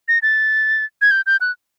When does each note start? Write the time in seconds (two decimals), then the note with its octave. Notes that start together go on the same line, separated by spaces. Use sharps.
0.08 A#6
0.22 A6
1.02 G#6
1.11 G6
1.26 G6
1.41 F#6